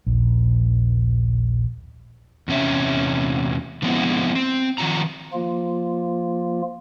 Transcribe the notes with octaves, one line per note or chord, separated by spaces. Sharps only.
D#1 A#1
E2 C3 C#4 E5
D3 F3 G#3 B3 C4 E4
C4
D#3 F3 F#3 A#5
F3 A#3 F4